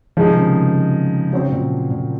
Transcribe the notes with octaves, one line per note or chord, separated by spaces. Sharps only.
D#3 F3 G#3 D#4 G#4
C3
C#3
C#3
C#3 F#3 C4 F#4 C5
A#2
A#2